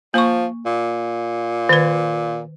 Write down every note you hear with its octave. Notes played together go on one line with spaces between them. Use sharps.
F3 A#3 C#6
A#2
D#3 B4